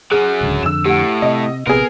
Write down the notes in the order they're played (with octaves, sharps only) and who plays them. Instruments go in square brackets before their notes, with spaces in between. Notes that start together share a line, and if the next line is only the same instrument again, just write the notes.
[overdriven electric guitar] F#3 C#4 [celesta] G#4 [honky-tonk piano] F#6
[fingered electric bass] D1 C#2 D3
[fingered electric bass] F2 D3 [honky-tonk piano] E6 E7
[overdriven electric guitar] A2 [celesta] G4 F#5
[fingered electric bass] C3 [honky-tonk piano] D#5
[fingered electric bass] A#1 C3 [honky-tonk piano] B3 G#4 [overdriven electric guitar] A#4